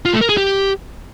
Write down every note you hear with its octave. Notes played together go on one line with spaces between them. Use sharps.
F4
A3
A#4
G#4
G4